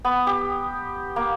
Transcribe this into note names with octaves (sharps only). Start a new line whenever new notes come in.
B3
G4
A#3